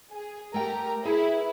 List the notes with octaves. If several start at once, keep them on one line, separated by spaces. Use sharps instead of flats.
G#4
A3 G4 A#4 G5 A#5
E4 G#4 B4